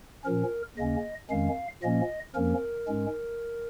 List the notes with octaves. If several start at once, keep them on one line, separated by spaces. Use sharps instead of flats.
A#2 F3 C#4 A#4
D#2 C#3 A#3 C#4 D#5
F2 D#3 G#3 C#4 F5
A#2 F3 A#3 C#4 D#5
F2 F3 A#3 C#4 A#4
G#2 G#3 C#4